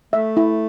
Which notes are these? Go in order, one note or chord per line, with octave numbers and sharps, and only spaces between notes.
A3 E5
E4